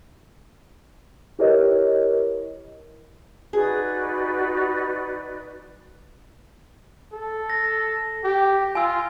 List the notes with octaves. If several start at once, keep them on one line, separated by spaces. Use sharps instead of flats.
E4 G4 A#4 B4 C#5 D#5
D#4 F#4 G#4 B4 D5
A4
A#6
G4
F4 G#5 E6